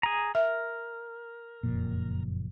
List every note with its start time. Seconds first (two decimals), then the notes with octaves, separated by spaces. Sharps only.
0.03 G#4 A#5
0.35 A#4 E5
1.63 F#1 F2 A#2